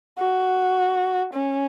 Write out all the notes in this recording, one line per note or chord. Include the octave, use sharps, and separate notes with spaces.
F#4
C#4